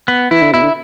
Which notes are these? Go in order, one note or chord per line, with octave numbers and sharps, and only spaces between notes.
B3
E3 E4
D3
B2 E4
D3